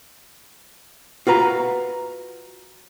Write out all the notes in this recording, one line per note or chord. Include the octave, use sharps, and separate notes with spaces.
F4 F#4 B4 A#5